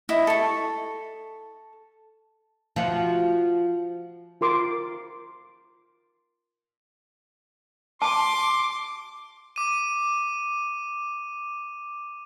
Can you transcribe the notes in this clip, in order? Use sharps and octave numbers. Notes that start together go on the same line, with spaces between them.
E4 D#5
A4 C#6
F3 F#4
F4 A#4 C6 D6
A5 C6 D6
D6 D#7